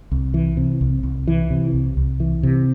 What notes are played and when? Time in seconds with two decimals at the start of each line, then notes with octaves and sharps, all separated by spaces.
0.11 C2
0.34 E3
0.57 C3
0.81 C2
1.03 C2
1.27 E3
1.50 C3
1.73 C2
1.97 C2
2.20 E3
2.43 C3